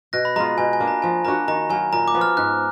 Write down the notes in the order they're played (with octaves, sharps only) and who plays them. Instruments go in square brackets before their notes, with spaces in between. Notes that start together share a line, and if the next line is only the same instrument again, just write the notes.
[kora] B2 [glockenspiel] F#6 A#6
[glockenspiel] B5
[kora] G#3 B3 F4 [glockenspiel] A#5
[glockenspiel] A#5
[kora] B2 [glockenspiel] G#5
[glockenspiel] G#5
[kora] A#3 D4
[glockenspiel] A#5
[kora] F3 [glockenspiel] G#5
[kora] A#3 D4 F#4 [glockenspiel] A#5
[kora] D#3 [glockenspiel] A#5
[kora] F#3 A#3 [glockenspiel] G#5
[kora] A#2 [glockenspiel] A#5
[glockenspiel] D6
[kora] F3 B3
[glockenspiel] F6
[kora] G#2 [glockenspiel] F#6